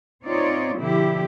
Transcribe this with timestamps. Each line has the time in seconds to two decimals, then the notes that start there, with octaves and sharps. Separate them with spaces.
0.25 C4 D#4 F4 C#5 D5
0.77 B2 D3 F3 E4 G4